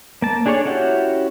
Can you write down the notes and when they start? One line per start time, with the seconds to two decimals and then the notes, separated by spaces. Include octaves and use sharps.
0.22 A#3 A5
0.46 D4 G#4 A4 C#5 D5
0.65 C#4 E4 F#4 G4 C#5